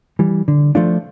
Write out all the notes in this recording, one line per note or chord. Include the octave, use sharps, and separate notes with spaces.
E3 G3
D3
F3 A3 D4 F4